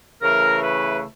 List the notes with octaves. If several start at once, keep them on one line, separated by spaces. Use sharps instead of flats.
C#3 E3 A3 A#4
B4